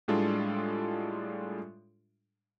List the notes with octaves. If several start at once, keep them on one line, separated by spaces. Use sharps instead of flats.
A2 G3 G#3 D4 F4 A4